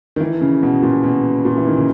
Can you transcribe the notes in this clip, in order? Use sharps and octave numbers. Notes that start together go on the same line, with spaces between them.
D#3
E3
C#3
B2
A#2
B2
A#2
E3
D#3
C#3